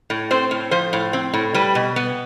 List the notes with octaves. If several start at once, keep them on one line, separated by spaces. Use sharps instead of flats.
A2
C4 C5
A2
F3 C5
A2
C4
A2
G3 B4
B2
B3